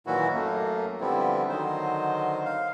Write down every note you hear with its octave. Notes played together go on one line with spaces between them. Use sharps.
A#2 D#3 E3 F#3 E4 F#4
F#2 A3 A#3
D3 F3 G3 B3 C4 E4
D3 D#3 F#3 D#4 C5
F5